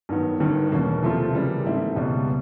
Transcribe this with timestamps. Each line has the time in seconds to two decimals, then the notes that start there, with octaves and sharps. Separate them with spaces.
0.09 G2 D#3 F#3 B3
0.40 G1 G2 D#3
0.72 E2 B2 F#3 A#3 C#4
1.02 C3 F3 A3 C4 F4
1.33 C#3 E3 G3 A#3
1.64 G#2 E3 A3 C4 E4
1.95 C#2 B2 G3